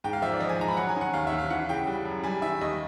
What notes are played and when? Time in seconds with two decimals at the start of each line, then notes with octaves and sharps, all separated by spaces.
0.04 G#2 G5
0.13 F5
0.22 F3 E5
0.32 D5
0.40 F3 D#5
0.49 G#5
0.59 G#2 A#5
0.68 B5
0.77 F#3 F#5
0.89 G#5
0.96 D#3 F#5
1.14 D#2 F5
1.27 D#2 E5
1.39 F5
1.50 E3 F#5
1.69 C#3 G5
1.87 G3
2.05 F#2
2.24 G3 G#5
2.42 D#3 E5
2.61 D#2 D#5